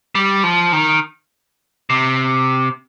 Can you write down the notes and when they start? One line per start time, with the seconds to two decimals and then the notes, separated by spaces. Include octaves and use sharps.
0.15 G3
0.44 F3
0.72 D#3
1.90 C3